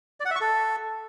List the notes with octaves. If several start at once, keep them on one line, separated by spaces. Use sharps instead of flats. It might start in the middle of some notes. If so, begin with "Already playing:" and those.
D5
F#5
E5
C#6
A4